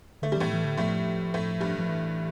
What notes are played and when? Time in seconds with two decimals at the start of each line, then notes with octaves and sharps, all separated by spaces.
0.22 D3 A3
0.32 G3
0.37 A2 E3 A3
0.53 E3
0.64 D3
0.78 A2 F3 A3
1.34 A2 A3
1.60 G2 G3
1.79 F3
1.89 E3